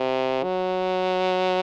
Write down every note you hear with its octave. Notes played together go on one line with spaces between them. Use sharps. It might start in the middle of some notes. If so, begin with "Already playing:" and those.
Already playing: C3
F#3